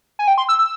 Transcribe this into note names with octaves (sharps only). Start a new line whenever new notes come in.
G#5
G5
C6
E6
E6